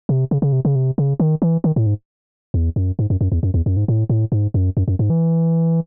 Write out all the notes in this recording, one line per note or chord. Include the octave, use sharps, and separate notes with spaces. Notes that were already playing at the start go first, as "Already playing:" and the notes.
C3
C#3
C#3
C3
C#3
C3
C#3
D#3
E3
D#3
A2
G#2
E2
F#2
G#2
F#2
F#2
E2
F#2
E2
F#2
G#2
A2
A2
G#2
F#2
F#2
F#2
G#2
E3